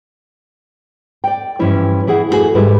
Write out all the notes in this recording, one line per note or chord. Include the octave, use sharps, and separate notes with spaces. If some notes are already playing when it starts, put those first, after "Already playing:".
D5 G5
G2 E3 F3 C#4 E4 C#5
E3 E4 G#4 F#5
F2 A3 C4 F#4 G#4
D#2 G#2 G3 E4 B4